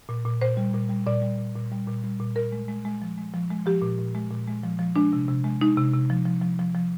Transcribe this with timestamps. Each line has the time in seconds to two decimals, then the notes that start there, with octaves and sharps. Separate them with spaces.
0.09 A#2
0.25 A#2
0.41 A#2 C5
0.57 G3
0.74 A#2
0.89 G3
1.07 A#2 D5
1.22 G3
1.38 A#2
1.55 A#2
1.72 G3
1.87 A#2
2.04 G3
2.20 A#2
2.36 A#2 A#4
2.52 G#3
2.68 G#3
2.85 G#3
3.02 F3
3.18 G#3
3.34 F3
3.50 G#3
3.66 F3 G4
3.82 A#2
3.99 A#2
4.15 G#3
4.30 A#2
4.48 G#3
4.63 F3
4.79 F3
4.96 G#3 D4
5.13 C3
5.29 C3
5.44 G#3
5.61 G#3 D#4
5.77 C3
5.94 C3
6.10 F3
6.25 F3
6.42 F3
6.59 F3
6.75 F3